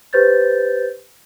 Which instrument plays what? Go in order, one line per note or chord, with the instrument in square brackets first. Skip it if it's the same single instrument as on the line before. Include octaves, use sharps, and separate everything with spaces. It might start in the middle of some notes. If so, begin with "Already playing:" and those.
[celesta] G4 B4 C5 G6 A6